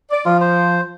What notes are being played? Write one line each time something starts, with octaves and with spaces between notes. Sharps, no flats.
D5
F3 F4
C5